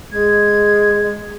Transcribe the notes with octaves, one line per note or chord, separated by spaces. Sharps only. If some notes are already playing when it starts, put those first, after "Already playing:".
G#3 G#6